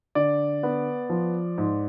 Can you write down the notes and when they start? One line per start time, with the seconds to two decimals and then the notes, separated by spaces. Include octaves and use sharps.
0.15 D3 D5
0.63 B3
1.09 F3
1.58 G#2